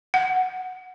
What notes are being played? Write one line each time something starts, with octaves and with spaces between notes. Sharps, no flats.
F#5